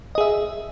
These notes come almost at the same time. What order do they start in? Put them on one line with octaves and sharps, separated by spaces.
D#5 G#4 E5